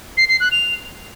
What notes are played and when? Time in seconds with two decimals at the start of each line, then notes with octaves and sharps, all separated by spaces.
0.17 C7
0.29 C7
0.40 F#6
0.52 F7